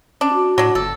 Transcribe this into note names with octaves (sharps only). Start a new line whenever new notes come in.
C#4 D4
F#4
A2 F#3 D4
G1 A4